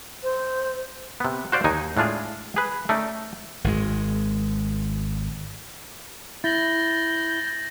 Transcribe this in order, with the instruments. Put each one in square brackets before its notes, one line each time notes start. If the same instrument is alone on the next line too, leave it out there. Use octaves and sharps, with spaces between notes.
[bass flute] C5
[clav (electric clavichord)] C3 B3
F#4 C5 D5 F5
D#2 D#4 G#5
A2 G#3 D4 F4 G#4
G#4 B4
A3 C#4 D#4 D5
[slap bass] G#1 G#3
[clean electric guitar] E4 [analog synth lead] G6 [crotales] A6 A#6 F#7